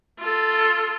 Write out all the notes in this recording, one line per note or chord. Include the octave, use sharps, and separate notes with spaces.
F4 A4